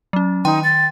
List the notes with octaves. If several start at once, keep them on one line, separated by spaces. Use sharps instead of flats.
F#3 C#4
D#3 D#4 G5 C6
A6